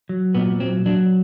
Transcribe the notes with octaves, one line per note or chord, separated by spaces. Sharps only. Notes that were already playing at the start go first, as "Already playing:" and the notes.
F#3
A#2 B3
F#3 C4
F#3 D4